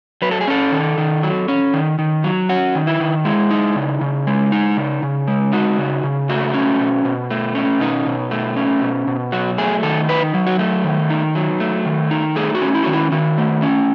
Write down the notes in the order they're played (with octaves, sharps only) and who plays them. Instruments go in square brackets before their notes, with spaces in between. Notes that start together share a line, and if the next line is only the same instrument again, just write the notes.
[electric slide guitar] F#3 B4
A4
G#4
C#4 A4
D#3
D#3
F#3
C#4
D#3
D#3
F#3
C#4 F#4
D#3
E4
D#3
G#3 E4
D#4
C#3
C#3
G#3
D#4
C#3
C#3
G#3
D#4 F#4
C#3
C#3
A3 F#4
C#4
B2
B2
A3
C#4
B2 D#4
B2
A3
C#4
B2
B2
F#3 F#4
A3 G#4
D#3 A4
D#4 B4
F#3
F#4
A3
D#3
D#4
F#3
A3
D#3
D#4
A3 G#4
F#4
C#4
E4
D#3 F#4
E4
D#3 F#4
A3
C#4